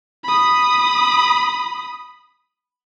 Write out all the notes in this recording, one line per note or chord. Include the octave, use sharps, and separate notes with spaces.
B5 D#6